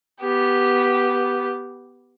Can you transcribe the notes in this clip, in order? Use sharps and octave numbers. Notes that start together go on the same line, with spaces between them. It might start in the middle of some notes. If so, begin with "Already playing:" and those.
B3 G4